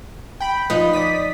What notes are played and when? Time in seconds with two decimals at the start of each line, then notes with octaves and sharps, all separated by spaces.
0.40 G5 B5
0.70 F3 D#4 B4
0.93 D5 D#6 B6